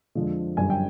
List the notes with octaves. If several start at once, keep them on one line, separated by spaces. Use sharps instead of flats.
F2 D3 F3 G#3
G1 F#2 D3 G3 G#5
G5